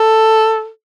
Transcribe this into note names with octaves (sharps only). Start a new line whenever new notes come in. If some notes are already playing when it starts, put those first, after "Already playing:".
Already playing: A4